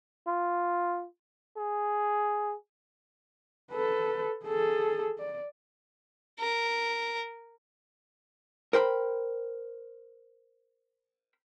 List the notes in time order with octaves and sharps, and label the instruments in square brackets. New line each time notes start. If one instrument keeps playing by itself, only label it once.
[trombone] F4
G#4
[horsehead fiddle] A4 B4
G#4 A4
D5
[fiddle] A#4
[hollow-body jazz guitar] A#4 C5 G5 B5